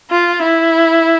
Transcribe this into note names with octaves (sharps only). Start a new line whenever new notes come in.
F4
E4